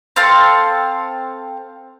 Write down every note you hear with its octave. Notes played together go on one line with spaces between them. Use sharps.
C4 A4 F5 C6